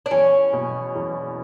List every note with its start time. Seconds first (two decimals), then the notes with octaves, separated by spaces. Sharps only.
0.06 D4
0.11 E2 C#4
0.53 B2
0.96 E2